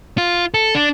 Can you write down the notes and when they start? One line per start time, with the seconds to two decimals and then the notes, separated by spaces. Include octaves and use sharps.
0.18 F4
0.54 A4
0.75 D4